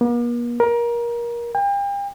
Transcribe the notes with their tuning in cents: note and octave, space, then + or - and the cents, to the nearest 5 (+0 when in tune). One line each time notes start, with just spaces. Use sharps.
A#3 +45
A#4 +25
G5 +40